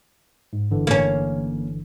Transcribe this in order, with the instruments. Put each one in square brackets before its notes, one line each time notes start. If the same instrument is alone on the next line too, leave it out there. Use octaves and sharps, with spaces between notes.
[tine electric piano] G#2
G1 D3 E3
[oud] A#3 C#4